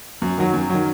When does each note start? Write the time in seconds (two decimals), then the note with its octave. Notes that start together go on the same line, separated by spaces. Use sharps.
0.22 F#2
0.38 D#3 F#3
0.54 F#2
0.70 D#3 F#3